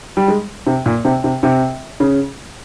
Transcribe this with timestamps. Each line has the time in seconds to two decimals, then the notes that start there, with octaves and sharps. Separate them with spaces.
0.17 G3
0.28 G#3
0.67 C3
0.86 A#2
1.05 C3
1.24 C3
1.43 C3
2.00 C#3